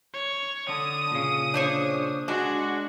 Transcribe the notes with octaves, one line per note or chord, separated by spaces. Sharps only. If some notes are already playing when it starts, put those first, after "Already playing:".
C#5
D3 D#6
A#2 C#3
D4 C5 C#5
G#3 D4 F#4